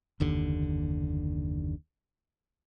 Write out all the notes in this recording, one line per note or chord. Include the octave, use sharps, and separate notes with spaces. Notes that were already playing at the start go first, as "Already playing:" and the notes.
F#1 D#2 D3